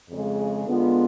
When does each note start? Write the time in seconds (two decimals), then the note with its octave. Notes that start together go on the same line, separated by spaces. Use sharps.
0.10 F2 C#3 G#3
0.65 D3 G#3 B3 F4